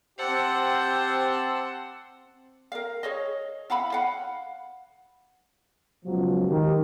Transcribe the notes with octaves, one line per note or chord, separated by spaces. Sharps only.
C4 G4 C5 F#5 A5 C6 E6
A#4 F5
G#4 C#5 D#5
E4 F5 F#5 B5
F5 F#5
C#2 B2 F3 F#3
D#3 G4